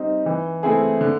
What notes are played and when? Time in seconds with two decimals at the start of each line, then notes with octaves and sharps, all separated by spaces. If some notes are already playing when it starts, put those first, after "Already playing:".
Already playing: G3 C4 D#4
0.26 E3
0.63 A3 C4 E4 G#4
1.01 D3